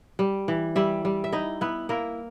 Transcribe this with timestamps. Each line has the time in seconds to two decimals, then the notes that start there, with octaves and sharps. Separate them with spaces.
0.19 G3
0.48 E3
0.76 G3 E4 E5
1.05 G3
1.24 E5
1.32 D#4 E4 D#5
1.61 B3 E4 B4
1.89 A#3 E4 A#4